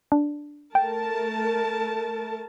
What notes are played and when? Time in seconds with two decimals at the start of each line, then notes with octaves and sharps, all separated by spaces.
0.12 D4
0.75 A3 A#4 G5 A5